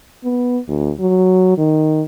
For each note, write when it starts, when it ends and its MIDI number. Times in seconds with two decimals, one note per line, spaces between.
0.24 0.58 59
0.68 0.91 38
1.00 1.54 54
1.58 2.03 51